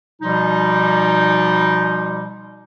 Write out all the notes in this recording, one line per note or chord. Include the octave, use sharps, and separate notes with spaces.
B2 F3 G3 D#4